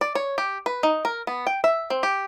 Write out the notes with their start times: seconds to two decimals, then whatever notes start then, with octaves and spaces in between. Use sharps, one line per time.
0.01 D5
0.15 C#5
0.38 G4
0.66 B4
0.83 D#4
1.05 A#4
1.27 B3
1.47 G5
1.64 E5
1.90 C4
2.03 G4